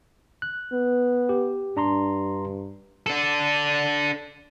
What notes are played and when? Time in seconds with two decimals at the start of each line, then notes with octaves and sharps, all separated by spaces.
0.42 F#6
0.73 B3
1.29 G4
1.77 G2 D4 A#5 C6
3.06 D4 A4